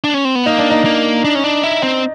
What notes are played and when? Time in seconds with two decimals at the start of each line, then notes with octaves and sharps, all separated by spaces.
0.04 D4
0.14 C#4
0.25 C4
0.35 B3
0.46 A#3 D#4
0.58 D4
0.70 D#4
0.85 A#3
1.25 D4
1.35 C#4
1.44 D4
1.64 E4
1.83 C4